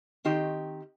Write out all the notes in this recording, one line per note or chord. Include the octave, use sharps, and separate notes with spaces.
D#3 C4 G4 D#5